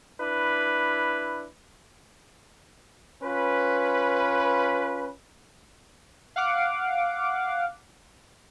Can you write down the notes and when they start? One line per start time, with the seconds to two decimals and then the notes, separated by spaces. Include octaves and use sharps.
0.21 D4 E4 B4
3.23 C#4 F4 B4
6.36 F5 F#5 D6